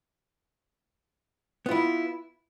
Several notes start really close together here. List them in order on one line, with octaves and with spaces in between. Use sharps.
B3 F4 E4